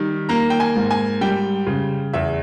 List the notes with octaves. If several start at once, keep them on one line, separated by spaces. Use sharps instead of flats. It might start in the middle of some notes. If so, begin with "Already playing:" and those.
Already playing: D#3 G3
A#3 A#5
G5
G#5
G#2
G#5
G3 G5
C#3
E2 E5